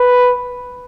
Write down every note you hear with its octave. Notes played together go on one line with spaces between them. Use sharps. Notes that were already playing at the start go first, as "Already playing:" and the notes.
Already playing: B4